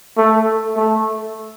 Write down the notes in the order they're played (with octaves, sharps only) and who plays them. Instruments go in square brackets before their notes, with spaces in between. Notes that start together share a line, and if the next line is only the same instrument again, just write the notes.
[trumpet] A3
A3